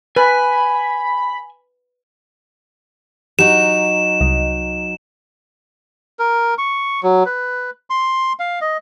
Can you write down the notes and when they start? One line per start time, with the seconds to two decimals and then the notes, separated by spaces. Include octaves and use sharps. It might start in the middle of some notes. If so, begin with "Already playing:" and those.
0.16 B4 G#5 B5
3.39 F#3 D#4 G4 E7
4.21 C2 D#5
6.19 A#4
6.58 C#6
7.03 F#3
7.26 B4
7.90 C6
8.39 F5
8.61 D#5